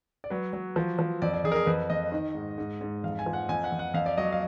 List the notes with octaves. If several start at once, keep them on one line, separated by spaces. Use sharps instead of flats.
D5
F#3 B4
F#3
F3
F3
F2 D5
D5
F2 G#4
A#4
G#4
F2 B4
F2 D#5
D#3
G#2
G#2
G#2
F2 F5
G#5
F3
F#5
F2 G#5
F#5
F2
F#5
F2 F5
D5
F#3 D#5
F5